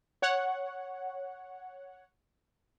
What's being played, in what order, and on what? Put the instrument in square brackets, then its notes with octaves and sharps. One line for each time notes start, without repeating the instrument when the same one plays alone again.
[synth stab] C#5 F#5